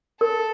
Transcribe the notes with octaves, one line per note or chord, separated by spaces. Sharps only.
A4 A#4